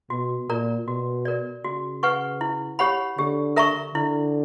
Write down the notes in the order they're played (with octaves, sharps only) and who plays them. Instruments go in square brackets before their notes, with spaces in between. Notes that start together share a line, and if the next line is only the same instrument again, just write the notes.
[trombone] B2 [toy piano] F#4
[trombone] A#2 [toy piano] A#4 D5 A#5
[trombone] B2 [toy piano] F#4
[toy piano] A#4 D5
[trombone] C#3 [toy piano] F#4
[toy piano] B4 F#5 C#6
E4
G4 C#5 F#5 B5
[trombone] D3 [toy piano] G4
[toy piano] A#4 E5 A#5 C#6
[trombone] D3 [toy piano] E4